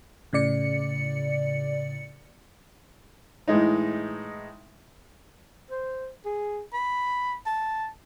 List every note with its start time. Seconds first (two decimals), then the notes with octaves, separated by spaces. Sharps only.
0.33 A2 C#3 D5 C#7
3.48 A2 E3 G#3 D#4
5.71 C5
6.25 G#4
6.73 B5
7.46 A5